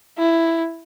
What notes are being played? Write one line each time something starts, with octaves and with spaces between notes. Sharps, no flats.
E4